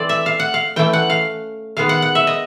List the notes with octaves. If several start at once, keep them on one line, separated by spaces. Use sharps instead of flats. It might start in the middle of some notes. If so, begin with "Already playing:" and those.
Already playing: E3 A3 C4 C5 D5
E5
F5
F#5
F5
E3 A3 C#4 G5
F#5
F5
D#3 G#3 B3 F5
F#5
F#5
E5
D#5